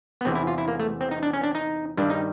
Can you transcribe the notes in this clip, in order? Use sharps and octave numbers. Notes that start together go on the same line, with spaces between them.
B3
E2 C3 E3 C4
E4
F4
E4
A#3
A3
C4
D#4
D4
C#4
D4
D#4
G2 D#3 G3 D4
D#4